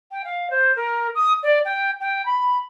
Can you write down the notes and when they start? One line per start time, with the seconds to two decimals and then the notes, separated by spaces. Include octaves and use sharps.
0.11 G5
0.24 F5
0.50 C5
0.76 A#4
1.15 D#6
1.43 D5
1.65 G5
2.00 G5
2.25 B5